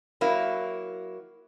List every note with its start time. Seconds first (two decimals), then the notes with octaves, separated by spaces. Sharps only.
0.21 F#3 A#3 E4